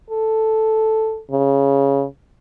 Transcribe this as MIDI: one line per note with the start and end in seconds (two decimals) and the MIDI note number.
0.10 1.20 69
1.31 2.05 49